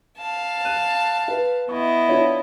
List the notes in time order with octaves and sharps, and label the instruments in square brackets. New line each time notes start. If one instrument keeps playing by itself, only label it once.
[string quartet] F5 A5
[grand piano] F#6 D#7
B4
[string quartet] B3 E4 D#5 [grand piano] C#6
[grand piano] D4 F4 C#5